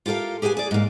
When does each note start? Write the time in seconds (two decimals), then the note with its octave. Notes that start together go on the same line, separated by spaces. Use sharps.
0.06 F4 G4 A4 A#4 F5
0.42 G4 G#4 B4 G5 G#5
0.57 G#4 D5
0.71 G#2 A#3